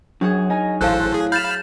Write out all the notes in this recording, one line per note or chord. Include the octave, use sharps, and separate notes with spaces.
F#2 F#3 D4 G#4 C#5
D#4 A#4 G#5
A1 A2 A4 C5 F5 A5 F#6
G#4
F5 B5 F6 G6 A6 E7